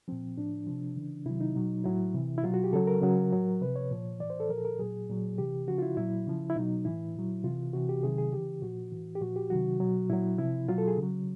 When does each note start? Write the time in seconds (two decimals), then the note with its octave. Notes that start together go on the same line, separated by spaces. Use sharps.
0.08 A#2 F3 C4
0.38 A2 F3 D4
0.67 C3 F3
0.96 C#3 E3
1.26 C3 D#3 F#3 E4
1.41 D#4
1.55 B2 F#3
1.84 A2 F#3 E4
2.15 C3 E3
2.38 E4
2.43 B2 F#3 F4
2.54 F#4
2.64 G4
2.73 C#3 F#3 A4
2.87 A#4
3.02 C#3 F#3
3.32 A2 F#3
3.61 C3 F3 B4
3.76 C#5
3.91 A#2 F3
4.20 A2 E3 D5
4.30 C5
4.40 A4
4.49 A#2 F3 A#4
4.58 A4
4.65 A#4
4.79 A#2 F#3 G#4
5.09 A#2 F#3
5.38 C3 E3 G4
5.67 C#3 F3 F#4
5.78 F4
5.82 E4
5.97 A#2 F#3 E4
6.27 C#3 F3
6.50 E4
6.56 B2 F#3 D#4
6.85 A2 E3 E4
7.15 A#2 F#3
7.44 C3 E3 F4
7.73 C3 E3 F#4
7.89 G4
8.03 C3 D#3 F#3 G#4
8.18 G#4
8.33 C#3 E3 G4
8.62 A#2 F3 F#4
8.92 A2 E3
9.15 G4
9.21 A#2 F3 F#4
9.36 G4
9.50 C3 D#3 F#3 F#4
9.80 B2 F#3
10.10 A#2 F#3 E4
10.39 C3 F3 E4
10.69 B2 F#3 F4
10.78 A4
10.88 G#4
10.97 C#3
11.02 F#3